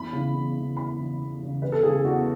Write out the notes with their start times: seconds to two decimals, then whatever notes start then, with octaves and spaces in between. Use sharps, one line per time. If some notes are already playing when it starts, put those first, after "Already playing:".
Already playing: E2 B5
0.13 C#3 E3
0.34 E2
0.55 C#3 E3
0.76 E2 B5
0.98 C#3 E3
1.19 E2
1.40 C#3 E3
1.62 E2 B4
1.72 A4
1.83 C#3 E3 G#4
1.94 G#4
2.05 E2 F#4